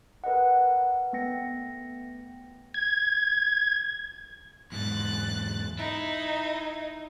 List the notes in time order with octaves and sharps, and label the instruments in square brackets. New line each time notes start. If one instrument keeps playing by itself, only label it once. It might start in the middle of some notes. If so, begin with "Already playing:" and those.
[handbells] A#4 B4 D#5 F#5
A3 B3 G5 A#6 C#7
[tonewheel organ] G#6
[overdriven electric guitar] E2 G#2 [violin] F#6 A6
[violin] D#4 [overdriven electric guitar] E4